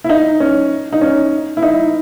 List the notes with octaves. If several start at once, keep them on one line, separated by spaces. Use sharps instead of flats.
E4
D#4
C#4
D#4
C#4
E4
D#4